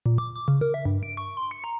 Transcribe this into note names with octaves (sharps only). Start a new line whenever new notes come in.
A#2
D6
D6
C#3
A#4
E5
G2
D7
C#6
C6
C#7
A#5